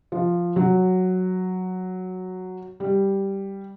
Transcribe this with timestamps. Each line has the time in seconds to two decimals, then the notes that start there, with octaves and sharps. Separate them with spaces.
0.12 F3
0.56 F#3
2.80 G3